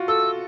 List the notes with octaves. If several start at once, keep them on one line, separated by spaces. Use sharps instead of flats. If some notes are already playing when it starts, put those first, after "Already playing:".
Already playing: F4 F#4
A4 E6